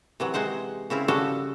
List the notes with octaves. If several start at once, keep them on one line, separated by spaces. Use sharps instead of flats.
C3 E3 F#3
C3 G#3 C5 F#5
C#3 C4 E4 F5
C#3 F3 G3 F#4 A4